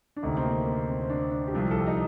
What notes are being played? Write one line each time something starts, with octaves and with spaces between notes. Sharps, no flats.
D4
D2 C3 D#3 D#4
C4
A#3
A#3
C4
C4
D4
D4
G4
C2 C3 F3 F4
A4
G4
D#4